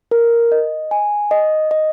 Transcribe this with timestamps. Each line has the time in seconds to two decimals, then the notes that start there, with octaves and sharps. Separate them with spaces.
0.11 A#4
0.52 D#5
0.91 G#5
1.31 D#5
1.71 D#5